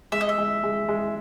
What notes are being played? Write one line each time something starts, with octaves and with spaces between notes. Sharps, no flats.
G#3 E5
D#5
E5
G#3
G#3
G#3